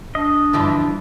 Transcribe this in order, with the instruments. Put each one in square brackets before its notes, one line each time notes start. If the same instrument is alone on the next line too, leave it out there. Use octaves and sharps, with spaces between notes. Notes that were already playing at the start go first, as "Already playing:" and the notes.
[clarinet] D4 [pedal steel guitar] D#5
[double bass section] G2 [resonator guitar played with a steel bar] D3 E3 F3